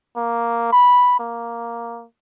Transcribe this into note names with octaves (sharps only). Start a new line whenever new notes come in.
A#3
B5
A#3